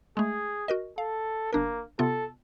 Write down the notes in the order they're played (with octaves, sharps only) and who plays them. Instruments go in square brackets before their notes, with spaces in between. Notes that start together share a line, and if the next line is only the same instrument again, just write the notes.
[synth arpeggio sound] G#3 A3 [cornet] G#4
[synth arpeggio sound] F#4 A#4 D#5
[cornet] A4 [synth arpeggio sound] F5
[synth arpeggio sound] G1 D4 A#4 [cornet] A#3
[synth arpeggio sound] C3 B3 F4 [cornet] A4